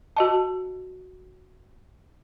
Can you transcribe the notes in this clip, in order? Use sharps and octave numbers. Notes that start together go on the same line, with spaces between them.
F#4 D#5 A5